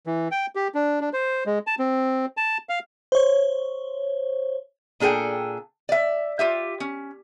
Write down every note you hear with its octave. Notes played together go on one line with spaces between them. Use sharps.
E3
G5
G4
D4
D4
C5
G#3
A5
C4
A5
F5
C5 C#5
A#2 D4 G#4 A4 G5
D5 E5
F4 G4 E5
C#4